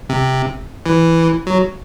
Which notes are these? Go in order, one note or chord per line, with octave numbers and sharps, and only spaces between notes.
C3
E3
F#3